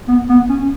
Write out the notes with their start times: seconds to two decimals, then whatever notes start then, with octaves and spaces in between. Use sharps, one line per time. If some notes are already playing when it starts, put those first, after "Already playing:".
0.08 B3
0.29 B3
0.49 C#4